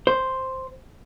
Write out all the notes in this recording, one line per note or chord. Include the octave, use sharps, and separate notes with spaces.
C5